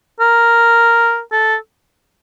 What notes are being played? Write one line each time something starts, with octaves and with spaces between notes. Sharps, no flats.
A#4
A4